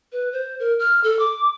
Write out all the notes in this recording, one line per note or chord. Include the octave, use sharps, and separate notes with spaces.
B4
C5
A#4
F6
A4
D6